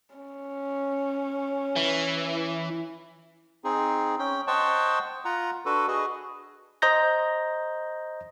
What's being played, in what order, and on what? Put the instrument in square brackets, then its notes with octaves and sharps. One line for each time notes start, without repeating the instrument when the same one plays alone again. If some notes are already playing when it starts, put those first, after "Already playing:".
[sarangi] C#4
[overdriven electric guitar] E3
[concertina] C4 D#4 G#4
C#4 G5
C5 D#5 F#5 G5 A5 C#6
F4 F#5 A#5
D4 F#4 A4 B4
F#4 G#4 B4 D#5
[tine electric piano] C5 D#5 A#5 G6 A#6